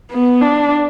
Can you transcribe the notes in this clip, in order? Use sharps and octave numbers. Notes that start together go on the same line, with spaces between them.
B3
D4